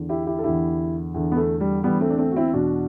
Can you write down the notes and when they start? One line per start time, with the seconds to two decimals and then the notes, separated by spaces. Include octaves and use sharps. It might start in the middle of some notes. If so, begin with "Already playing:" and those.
Already playing: E2 D3
0.09 E4 G4
0.26 E4 G4
0.38 A4
0.44 E2 D3 E4 G4
1.14 E2 D3
1.32 B3
1.37 A3
1.60 G3
1.83 E2 D3 G3 B3
2.01 A3 C4
2.10 D4
2.18 A3 C4
2.31 F#4
2.36 C4 E4
2.53 E2 B2 D4 F#4